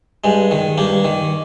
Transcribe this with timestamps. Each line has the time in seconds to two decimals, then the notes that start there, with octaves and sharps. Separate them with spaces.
0.24 G2 G#3
0.51 D#3
0.78 G2 A#3
1.04 D#3